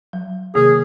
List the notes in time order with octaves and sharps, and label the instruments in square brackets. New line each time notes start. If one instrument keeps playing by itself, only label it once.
[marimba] F#3
[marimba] C3 D#3 A#3 [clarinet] G#4